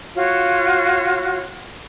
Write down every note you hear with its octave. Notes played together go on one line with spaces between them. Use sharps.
F4 F#4 C#5